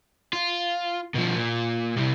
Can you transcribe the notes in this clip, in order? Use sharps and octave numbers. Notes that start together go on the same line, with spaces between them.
F4
B2 F3
A#2
C2 C3